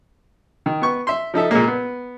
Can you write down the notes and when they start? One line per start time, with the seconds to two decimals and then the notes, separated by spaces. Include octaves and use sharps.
0.66 D#3
0.82 B3 C#6
1.07 E5 C6
1.34 F3 D#4 A4 E5
1.51 A#2 G#3 A#3
1.67 B3